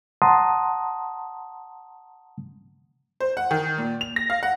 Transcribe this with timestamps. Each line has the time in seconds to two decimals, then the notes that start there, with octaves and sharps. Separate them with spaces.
0.22 F#5 A5 A#5 C6 D#6
3.20 C5
3.37 F#5
3.51 D#3
3.78 A#2
4.01 F7
4.16 A#6
4.30 F5
4.43 F#5